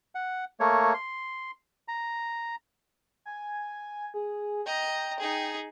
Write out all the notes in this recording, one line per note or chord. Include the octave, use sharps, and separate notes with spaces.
F#5
A3 A#3 C#5
C6
A#5
G#5
G#4
D#5 G5 A#5
D#4 G#4